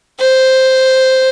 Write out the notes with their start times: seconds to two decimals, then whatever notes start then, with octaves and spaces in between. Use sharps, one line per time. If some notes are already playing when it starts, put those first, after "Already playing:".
0.20 C5